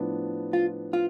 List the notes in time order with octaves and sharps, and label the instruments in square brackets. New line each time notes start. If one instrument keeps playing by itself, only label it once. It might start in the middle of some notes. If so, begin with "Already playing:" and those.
Already playing: [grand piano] A2 F3 B3 D4
[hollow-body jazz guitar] F4
F4